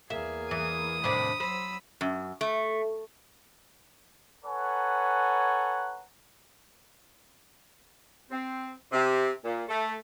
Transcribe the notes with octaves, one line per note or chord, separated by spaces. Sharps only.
E2 A#3 G#4 E5
E3 D#6
A2 C3 D#3 D4 B5
F#3 C5 B5 E6
F#2
A3
A4 B4 C#5 F#5 G#5 A#5
C4
C3
A#2
A3